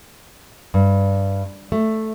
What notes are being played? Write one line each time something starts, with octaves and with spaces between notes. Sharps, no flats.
G2
A3